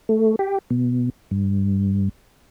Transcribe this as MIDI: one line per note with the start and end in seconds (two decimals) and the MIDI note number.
0.09 0.36 57
0.39 0.58 67
0.70 1.09 47
1.31 2.09 43